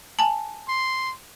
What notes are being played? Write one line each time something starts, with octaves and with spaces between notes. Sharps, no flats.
G#5 A5
C6